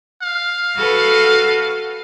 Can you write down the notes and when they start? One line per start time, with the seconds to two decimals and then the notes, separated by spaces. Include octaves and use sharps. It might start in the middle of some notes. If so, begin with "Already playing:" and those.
0.22 F5
0.76 F#4 A4 B4